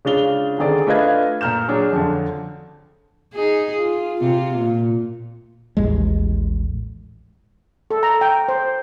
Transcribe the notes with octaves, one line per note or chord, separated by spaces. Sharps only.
C#3 G#3 D4 F4 F7 G7
D3 D#3 C4 G#4 A4 D5
A3 D4 F4 B4 D#5 G#6
A#2 A#5 F6 G6 E7
F#3 D4 G#4
F2 D3
D#4 G#4
F4
C3 F4
A#2
A1 D#2 G#3
A4
A#5
G5
C5